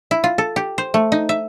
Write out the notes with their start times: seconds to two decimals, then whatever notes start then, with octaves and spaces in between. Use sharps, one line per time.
0.11 E4
0.24 F4
0.38 A4
0.56 G4
0.78 C5
0.94 A3
1.12 D#4
1.29 E5